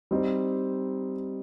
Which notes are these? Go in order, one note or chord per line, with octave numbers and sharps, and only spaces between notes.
G3 C4 D#4